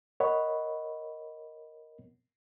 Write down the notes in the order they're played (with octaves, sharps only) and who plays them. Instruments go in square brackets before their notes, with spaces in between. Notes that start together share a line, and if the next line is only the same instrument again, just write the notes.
[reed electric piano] A#4 C#5 D#5 F#5 B5